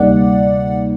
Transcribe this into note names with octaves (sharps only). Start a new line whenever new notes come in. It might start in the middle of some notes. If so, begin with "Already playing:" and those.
Already playing: D2 C3 G3 A#3 D#4 D5 F#5